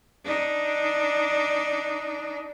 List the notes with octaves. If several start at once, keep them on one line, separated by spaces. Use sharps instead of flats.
D4 D#4